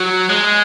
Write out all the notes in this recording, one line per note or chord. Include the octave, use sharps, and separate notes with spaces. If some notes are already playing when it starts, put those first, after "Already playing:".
Already playing: F#3
G#3